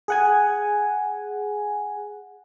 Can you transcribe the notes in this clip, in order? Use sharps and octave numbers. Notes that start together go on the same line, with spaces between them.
G#4 F#5 G#5